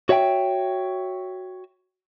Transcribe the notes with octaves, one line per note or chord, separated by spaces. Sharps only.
F#4 C#5 E5 F#5 G5